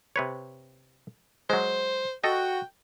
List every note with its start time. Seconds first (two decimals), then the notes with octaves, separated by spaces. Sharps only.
0.16 C3 B4 C#5
1.50 F#3 G#3 C5
2.24 F#4 A4 D#5 G5